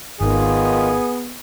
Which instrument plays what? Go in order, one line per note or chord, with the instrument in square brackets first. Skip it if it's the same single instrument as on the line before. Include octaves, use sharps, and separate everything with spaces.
[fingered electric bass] G#1 [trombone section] D#3 F4 [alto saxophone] B3 [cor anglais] G#4